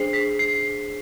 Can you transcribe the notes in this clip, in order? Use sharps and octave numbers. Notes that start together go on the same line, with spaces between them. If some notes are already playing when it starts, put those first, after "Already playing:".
Already playing: D4 G#4 C5 C7
B6
C7